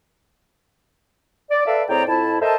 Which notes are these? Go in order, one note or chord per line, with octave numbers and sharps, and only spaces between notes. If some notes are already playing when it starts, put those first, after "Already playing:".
D5
A4 B4 D5 E5 F5
A2 C4 G#4 D5 G5 A#5
F2 E4 A5
A4 A#4 C5 D#5 E5 A5